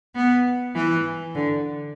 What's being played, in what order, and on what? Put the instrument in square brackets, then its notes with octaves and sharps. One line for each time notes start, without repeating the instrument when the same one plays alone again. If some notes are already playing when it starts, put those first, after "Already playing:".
[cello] B3
E3
D3